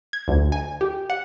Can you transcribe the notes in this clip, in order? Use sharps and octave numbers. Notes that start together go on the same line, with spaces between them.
G#6
D2
G#5
G4
F#5